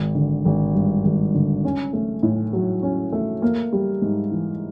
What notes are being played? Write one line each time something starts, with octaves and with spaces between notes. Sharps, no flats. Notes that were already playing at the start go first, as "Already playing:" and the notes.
Already playing: G#1
D3
G#1
G2
G#1
D3
C#4
A3
A2
F#3
C#4
A3
A#3
G3
G#2
E3